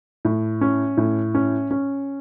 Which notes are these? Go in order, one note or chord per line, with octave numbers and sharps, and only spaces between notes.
A2
C#4
A2
C#4
C#4